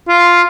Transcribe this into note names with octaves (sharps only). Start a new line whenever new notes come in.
F4